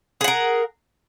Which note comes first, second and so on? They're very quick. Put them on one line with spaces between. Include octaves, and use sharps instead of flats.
G#4 F#5 A#4